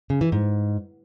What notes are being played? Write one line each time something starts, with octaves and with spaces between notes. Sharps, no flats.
C#3
E3
G#2